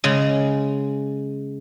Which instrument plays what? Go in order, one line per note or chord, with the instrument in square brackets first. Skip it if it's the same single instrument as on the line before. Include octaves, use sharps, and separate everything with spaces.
[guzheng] C#3 G#3